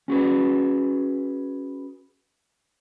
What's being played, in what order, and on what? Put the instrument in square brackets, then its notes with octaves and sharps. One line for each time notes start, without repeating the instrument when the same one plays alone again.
[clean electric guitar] C#4 F#4 G#4 B4